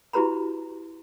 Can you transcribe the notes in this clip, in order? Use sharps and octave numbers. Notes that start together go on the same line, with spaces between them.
E4 F#4 G4 B4 A#5 B5